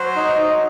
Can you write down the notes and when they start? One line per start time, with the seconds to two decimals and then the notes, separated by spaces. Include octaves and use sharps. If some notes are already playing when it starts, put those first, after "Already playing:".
Already playing: F#3 C5
0.16 D#4
0.38 D#4